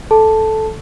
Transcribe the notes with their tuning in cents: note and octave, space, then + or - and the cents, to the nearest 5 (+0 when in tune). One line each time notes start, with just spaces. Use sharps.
A4 -10 A5 +0